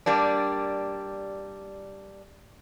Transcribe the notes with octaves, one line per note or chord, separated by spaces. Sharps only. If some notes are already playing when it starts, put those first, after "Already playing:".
G3 A#3 D4